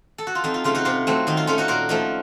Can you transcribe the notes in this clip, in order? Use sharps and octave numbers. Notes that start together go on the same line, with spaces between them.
A4
F#4
F4
F2 D#4
F4
C#3 A3 D#4 F4
D#4 F#4
C3 F4
F#3 A3 C4
D#3 D#4
F4
A3 C#4 F4
D#4 F#4
A#2 F#4 A#4
F3 A3 D#4